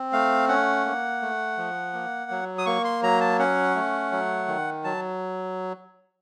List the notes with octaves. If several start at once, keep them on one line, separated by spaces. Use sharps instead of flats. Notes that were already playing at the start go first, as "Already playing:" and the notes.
Already playing: C4
A3 F5
C#4 F#5
A#3
A3
F3
A#3
F#3
D#6
A#3 C#6
C6
F#3 A#5
A5
C#4 F#5
A3
F#3
D#3
F#3 A5